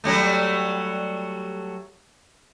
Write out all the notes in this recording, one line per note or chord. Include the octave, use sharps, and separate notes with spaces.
F#3 G3 A3